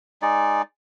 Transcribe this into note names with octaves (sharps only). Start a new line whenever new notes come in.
G#3 D#4 D5